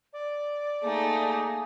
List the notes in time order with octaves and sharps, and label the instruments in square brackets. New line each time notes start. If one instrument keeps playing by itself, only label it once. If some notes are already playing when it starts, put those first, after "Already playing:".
[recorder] D5
[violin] A3 D#4 [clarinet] A#3 [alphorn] G#4